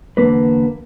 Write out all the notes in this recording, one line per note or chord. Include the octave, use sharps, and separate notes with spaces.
E2 G#2 D3 A#3 B4